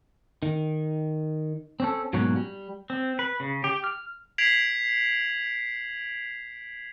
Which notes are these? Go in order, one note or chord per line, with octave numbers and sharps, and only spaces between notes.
D#3
C4 C#4 A4
G#2 B2 F#3 A#3 C#4 F#4
G3
C4
B4
C#3
G4
F6
G#6 B6 C7 D7 F7 F#7